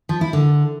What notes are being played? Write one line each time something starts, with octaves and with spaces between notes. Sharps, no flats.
F3
E4
D3